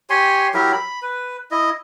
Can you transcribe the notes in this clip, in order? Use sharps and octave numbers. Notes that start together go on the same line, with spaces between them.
G4 C#5 G#5 C6
F#3 E4 G4 A#4
B5
B4
E4 D#5